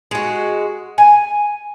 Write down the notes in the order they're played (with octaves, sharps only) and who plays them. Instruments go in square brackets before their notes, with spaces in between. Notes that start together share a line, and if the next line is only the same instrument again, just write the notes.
[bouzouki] G#3 F#4
G#5